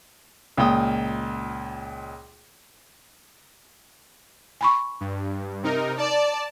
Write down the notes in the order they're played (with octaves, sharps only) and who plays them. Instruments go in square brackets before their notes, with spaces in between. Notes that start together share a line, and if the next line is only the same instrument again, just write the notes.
[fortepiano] C#2 A#2 G5 D#6
[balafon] G#5 B5 C#6
[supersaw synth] G2
C3 D#4 A#4
[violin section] D5 [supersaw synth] A5